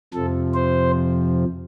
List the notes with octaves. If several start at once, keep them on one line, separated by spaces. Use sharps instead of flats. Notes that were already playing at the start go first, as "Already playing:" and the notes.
F2 C3 F3 A4
C5